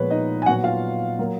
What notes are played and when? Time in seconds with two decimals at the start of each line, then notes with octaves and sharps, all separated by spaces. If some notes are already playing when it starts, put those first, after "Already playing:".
Already playing: A#2 F3 G#3 B3 B4 C#5
0.11 D#4 D#5
0.42 G#5
0.46 A#2 F#3 B3 F#4 F#5
0.64 F4 F5
1.19 F#3 A#3